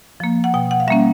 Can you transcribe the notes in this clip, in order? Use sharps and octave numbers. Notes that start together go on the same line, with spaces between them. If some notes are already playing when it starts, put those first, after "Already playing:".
F3 A#3
F#5
B2 G5
F#5
F5
G3 A#3 C#4 E5